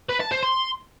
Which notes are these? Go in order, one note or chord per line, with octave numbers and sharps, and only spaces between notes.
B4
A5
C5
C6